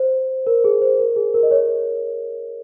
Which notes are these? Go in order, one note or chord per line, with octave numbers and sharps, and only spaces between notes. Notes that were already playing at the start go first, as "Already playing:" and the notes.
Already playing: C5
A#4
G#4
C5
A#4
G#4
A#4
D#5
C#5